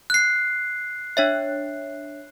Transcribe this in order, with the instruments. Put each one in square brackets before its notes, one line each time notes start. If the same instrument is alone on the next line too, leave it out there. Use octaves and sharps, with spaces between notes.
[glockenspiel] F#6 C7
[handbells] D4 C#5 E5